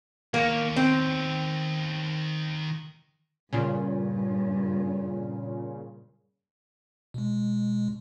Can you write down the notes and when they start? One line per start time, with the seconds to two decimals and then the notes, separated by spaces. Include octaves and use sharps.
0.34 D#3 A#3 C#5
0.76 C4
3.53 G2 A#2 C#3
7.14 B2 G#3